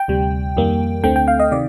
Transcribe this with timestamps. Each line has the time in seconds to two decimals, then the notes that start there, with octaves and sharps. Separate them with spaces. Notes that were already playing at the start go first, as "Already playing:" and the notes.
Already playing: G5
0.08 D2 C3 G3
0.57 F2 D#3 G3 A#3
1.03 D2 D3 A3 C4 G5
1.16 G5
1.28 F5
1.40 D#5
1.51 C3 D#3 D5